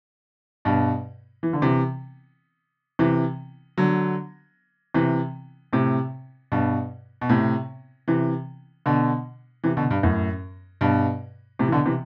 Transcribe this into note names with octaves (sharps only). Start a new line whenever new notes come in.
G2 B2
E3
D3
C3 E3
C3 E3
D3 F#3
C3 E3
A2 C3
G2 B2
B2
A2 C3
C3 E3
B2 D3
C3 E3
B2 D3
G2
F#2 A2
G2 B2
A2 C3
E3
B2 D3
C3 E3